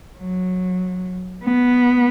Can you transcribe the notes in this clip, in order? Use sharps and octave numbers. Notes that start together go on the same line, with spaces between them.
F#3
B3